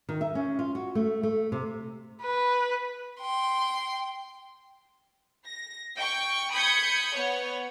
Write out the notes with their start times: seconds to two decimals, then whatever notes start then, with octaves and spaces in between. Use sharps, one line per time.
0.09 D#3
0.21 E5
0.35 C#4
0.59 F4
0.75 F#4
0.95 A3
1.23 A3
1.52 C3
2.22 B4
3.20 G5 C6
5.45 A#6
5.96 G5 C#6
6.52 B5 D#6 G6 G#6 C#7
7.15 B3 C#5